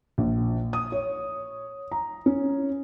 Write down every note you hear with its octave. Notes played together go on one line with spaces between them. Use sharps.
A#1
D#6
C#5
A#5
C#4